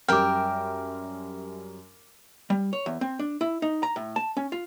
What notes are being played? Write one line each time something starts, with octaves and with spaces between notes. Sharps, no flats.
F#2 G3 A#4 E5 G5 D6 F6
G3
C#5
E2
C4
D4
E4
D#4
A#5
A2
A5
C#4
F4